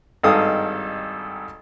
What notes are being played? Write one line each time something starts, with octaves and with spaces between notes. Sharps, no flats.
G#1 G2 D#4 A4 F5 D#6